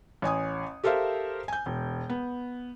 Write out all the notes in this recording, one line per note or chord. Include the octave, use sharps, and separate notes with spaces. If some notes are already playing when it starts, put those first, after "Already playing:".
A1 C#5 G#5 D#6
G4 A4 A#4 C5 E5 F5
G#5 G6
E1
B3